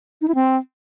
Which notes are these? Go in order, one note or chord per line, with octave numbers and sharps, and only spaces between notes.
D#4
E4
C4